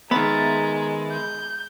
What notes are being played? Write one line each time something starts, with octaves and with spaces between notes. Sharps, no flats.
D#3 G#3 B3 E5 A#5 B5 A6
G6